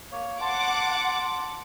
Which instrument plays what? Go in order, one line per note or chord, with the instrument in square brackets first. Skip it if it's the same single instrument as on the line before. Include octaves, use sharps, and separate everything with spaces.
[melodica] A#3 C#5
[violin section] F#5 D6 [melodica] A5 [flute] C6